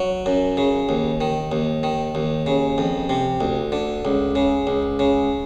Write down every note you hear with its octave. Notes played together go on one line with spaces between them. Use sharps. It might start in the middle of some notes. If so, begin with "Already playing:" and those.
Already playing: F#3
F#2
C#3
D#2
D#3
D#2
D#3
D#2
C#3
F2
C3
D2
D3
C#2
C#3
C#2
C#3